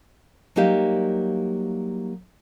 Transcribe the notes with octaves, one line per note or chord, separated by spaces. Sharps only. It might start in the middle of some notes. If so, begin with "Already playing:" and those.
F#3 G3 A#3 D#4 G4 F5